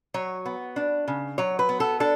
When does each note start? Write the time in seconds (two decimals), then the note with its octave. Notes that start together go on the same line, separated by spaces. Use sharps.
0.14 F#3 C#5
0.46 B3
0.76 D4
1.08 C#3
1.38 F#3 C#5
1.59 B4
1.69 B3
1.80 A4
2.00 D4 A4